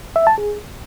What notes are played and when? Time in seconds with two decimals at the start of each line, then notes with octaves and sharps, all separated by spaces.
0.16 E5
0.27 A5
0.38 G#4